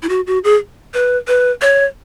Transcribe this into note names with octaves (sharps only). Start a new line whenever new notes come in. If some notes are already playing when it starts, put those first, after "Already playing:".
E4
F#4
F#4
G#4
B4
B4
C#5